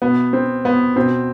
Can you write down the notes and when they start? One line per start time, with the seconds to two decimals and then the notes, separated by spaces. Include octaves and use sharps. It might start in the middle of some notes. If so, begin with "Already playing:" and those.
0.02 B2 B3
0.33 C4
0.65 B3
0.96 B2 C4